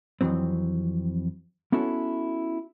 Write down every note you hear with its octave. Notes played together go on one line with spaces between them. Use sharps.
F2 G#2 E3 F#3 C4
B3 C#4 E4 F#4 A4